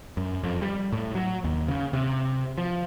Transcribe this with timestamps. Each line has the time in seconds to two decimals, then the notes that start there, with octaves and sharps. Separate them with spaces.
0.17 F#2
0.43 F2
0.62 G3
0.92 A2
1.15 F#3
1.44 D#2
1.68 C#3
1.93 C3
2.58 F3